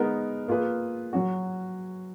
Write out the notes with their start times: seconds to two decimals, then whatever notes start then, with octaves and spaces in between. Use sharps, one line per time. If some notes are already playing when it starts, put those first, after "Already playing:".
Already playing: G#3 B3 D#4 A#4
0.48 A#3 F4 G#4 B4
1.13 F#3 C#4 F#4